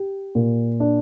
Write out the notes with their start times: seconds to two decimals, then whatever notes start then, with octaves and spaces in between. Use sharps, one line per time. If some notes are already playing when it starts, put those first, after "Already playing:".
Already playing: G4
0.35 A#2
0.80 D4